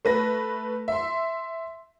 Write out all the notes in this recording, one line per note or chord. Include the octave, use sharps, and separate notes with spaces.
A3 B4 A#6
E5 C6